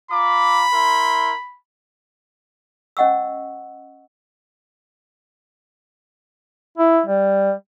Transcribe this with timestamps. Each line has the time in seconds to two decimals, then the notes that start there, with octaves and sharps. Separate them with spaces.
0.11 F4 A#5 B5 D6
0.72 E4 A#4 C6
2.97 C#4 D#5 F#5 C#6 E6
6.78 E4
7.07 G3